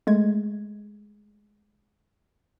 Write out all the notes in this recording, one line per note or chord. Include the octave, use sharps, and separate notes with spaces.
G#3 A3 G#6